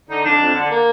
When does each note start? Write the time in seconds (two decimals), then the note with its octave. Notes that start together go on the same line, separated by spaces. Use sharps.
0.08 D3 D#4
0.24 F2 D4
0.40 F2
0.55 D3
0.71 A#3